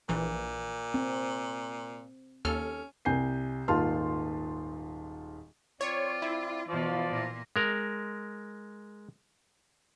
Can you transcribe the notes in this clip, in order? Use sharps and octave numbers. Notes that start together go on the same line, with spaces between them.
A#1 A#2 E3
C4
D#2 C#4 A4 F6
C2 G#5 G6 C7
D#1 G#2 F4 A5 C6 F6
C4 F4 C#5 D5
E4
B2 E3 F3 F4 D5 C6
A#2 A#3
G#3 A#4